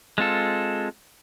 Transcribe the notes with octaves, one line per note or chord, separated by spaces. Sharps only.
G#3 C4 F4 A4